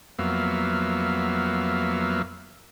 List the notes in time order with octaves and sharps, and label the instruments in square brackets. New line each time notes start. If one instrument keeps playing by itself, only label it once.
[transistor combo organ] F2 F#3 A#3 B3 E5 F5